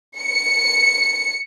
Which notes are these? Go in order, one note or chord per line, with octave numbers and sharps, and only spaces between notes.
C#7